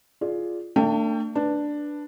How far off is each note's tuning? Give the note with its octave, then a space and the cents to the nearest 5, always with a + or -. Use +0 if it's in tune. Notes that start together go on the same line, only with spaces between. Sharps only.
F4 +0 G#4 +10 D5 +0
A3 +45 D4 +10 G5 +10
D4 +5 B4 +0